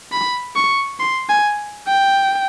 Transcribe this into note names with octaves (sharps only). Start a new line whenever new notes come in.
B5
C#6
C6
G#5
G5